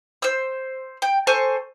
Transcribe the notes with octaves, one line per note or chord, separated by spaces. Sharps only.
C5 E6
G5
A4 C5 G#5 C#6